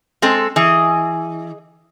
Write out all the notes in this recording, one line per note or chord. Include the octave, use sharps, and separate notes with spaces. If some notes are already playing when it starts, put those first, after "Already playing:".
G#3 C4 A4
E3 G#4 D#5